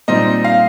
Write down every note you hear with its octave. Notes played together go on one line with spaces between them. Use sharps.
A#2 G3 C4 D#4 D#5
F5